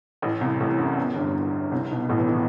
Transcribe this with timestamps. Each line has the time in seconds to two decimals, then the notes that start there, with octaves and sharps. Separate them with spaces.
0.22 A1 A2
0.41 C2 C3
0.60 A1 A2
0.79 F#2
0.97 E2
1.15 G1 G2
1.72 C2 C3
1.91 B1 B2
2.09 A1 A2
2.19 E2 E3
2.29 D#3